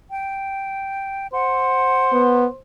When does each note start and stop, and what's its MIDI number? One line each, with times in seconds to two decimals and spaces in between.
0.10 1.27 79
1.33 2.60 72
1.33 2.21 78
2.12 2.46 59